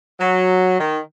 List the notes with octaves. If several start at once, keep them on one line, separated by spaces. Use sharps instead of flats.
F#3
D#3